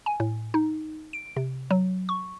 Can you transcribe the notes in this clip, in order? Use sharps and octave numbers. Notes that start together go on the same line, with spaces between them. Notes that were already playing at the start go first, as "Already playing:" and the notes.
G#5
A2
D#4
D7
C3
F#3
C#6